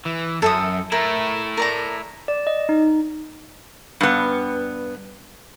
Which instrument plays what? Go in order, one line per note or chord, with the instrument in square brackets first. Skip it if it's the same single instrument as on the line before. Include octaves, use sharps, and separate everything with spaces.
[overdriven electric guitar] E3
[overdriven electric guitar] F#2 [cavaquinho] A4 E5 D#6
[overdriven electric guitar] A3 E4 [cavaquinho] A#4
[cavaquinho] A#4 D5 A#5
[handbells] D5
D#5
D#4
[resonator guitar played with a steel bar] G2 B3